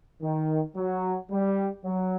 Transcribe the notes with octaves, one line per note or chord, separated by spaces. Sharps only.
D#3
F#3
G3
F#3